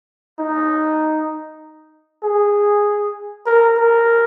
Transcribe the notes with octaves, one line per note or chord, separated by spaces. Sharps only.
D#4
G#4
A#4
A#4